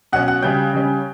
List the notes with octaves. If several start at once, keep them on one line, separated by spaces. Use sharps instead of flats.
B2 F#3 C#4 F#5 F#6
F#5 F#6
C#3 G3 C#4 G5 G6
C#3 G3 C#4